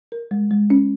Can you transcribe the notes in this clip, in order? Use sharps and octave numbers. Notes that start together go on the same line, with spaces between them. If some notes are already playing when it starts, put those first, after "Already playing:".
A#4
G#3
G#3
C#4